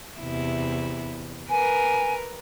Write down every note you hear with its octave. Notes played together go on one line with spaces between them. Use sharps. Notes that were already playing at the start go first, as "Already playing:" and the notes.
E2 C3 E4
A#4 B4 G#5